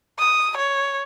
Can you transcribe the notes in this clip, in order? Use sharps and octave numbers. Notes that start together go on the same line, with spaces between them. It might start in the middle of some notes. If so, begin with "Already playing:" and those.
D#6
C#5